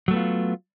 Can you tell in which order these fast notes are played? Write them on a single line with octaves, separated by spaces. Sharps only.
F#3 A3 B3 F4